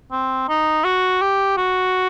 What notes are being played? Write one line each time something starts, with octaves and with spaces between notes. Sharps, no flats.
C4
D#4
F#4
G4
F#4